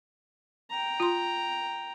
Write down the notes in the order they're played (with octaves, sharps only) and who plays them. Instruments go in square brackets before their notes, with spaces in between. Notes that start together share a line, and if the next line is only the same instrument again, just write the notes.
[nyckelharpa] G5 A#5
[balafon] F4 C6